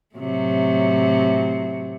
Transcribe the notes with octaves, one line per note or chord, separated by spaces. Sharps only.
A2 C3 F#3